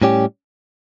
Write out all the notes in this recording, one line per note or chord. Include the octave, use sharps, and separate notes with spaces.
A2 G3 C#4 G4